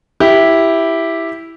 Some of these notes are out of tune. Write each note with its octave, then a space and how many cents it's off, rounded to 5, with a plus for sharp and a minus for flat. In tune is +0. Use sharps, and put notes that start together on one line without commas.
E4 +0 G4 +0